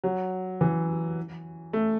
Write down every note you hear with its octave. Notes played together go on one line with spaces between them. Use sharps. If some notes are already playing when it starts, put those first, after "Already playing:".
F#3
E3
A3